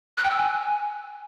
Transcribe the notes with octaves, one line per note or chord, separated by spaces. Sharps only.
F#6
G5
E6
G#5